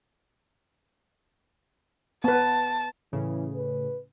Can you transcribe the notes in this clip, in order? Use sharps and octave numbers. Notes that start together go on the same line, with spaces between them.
B3 B4 A5
A2 C#3 E3
B4